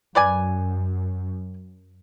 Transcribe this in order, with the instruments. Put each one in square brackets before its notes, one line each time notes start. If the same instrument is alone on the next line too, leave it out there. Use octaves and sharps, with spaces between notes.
[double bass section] F#2 [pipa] B4 D5 G#5